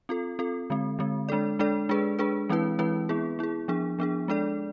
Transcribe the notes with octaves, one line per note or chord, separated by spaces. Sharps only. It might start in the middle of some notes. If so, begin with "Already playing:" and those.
C4 F4 A4
C4 F4 A4
D3 G#3 C4
D3 G#3 C4
G#3 D4 A4 D5
G#3 D4 A4 D5
G#3 D4 G#4 B4
G#3 D4 G#4 B4
E3 G#3 C4 E4 B4
E3 G#3 C4 E4 B4
B3 E4 G#4
B3 E4 G#4
F3 B3 D4 G#4
F3 B3 D4 G#4
G#3 D4 A4 D5